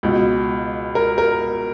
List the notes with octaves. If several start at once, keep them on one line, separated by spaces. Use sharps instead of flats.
C#2 B2
A#4
A#4